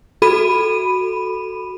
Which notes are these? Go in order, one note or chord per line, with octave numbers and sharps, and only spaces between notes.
F#4 A4 B5 D#7